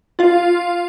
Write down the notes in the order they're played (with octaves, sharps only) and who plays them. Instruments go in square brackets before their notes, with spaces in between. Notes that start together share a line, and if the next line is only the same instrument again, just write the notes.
[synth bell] F4 F5